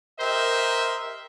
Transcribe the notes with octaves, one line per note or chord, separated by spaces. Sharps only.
G4 A#4 C5 D#5 E5